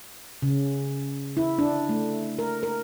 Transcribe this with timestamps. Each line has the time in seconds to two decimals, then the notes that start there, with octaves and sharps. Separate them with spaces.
0.42 C#3
1.37 E4
1.59 D4
1.89 A3
2.39 A#4
2.63 A#4